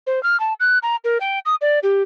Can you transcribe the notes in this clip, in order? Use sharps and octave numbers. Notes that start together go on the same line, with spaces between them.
C5
F6
A5
F#6
A#5
A#4
G5
D#6
D5
G4